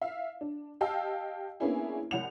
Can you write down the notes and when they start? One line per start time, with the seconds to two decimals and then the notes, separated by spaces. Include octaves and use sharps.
0.01 E5 F5
0.41 D4
0.81 G4 D#5 F5 G5 A5 E6
1.60 A#3 B3 C#4 D4 E4 G#4
2.11 C2 F#5 F7